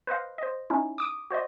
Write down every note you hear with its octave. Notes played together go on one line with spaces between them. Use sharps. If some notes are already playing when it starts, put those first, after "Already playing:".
B4 C5 D#5 F5
C5 D#5
C#4 D#4 E4
D6 D#6 D7
F#4 C5 D5 D#5